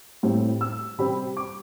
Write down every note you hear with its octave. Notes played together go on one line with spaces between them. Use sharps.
A2 G3 C4
E6
C3 G3 C4 B5
D6